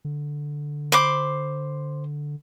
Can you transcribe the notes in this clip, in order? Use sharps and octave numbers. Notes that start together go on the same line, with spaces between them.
D3
C5 B5 D6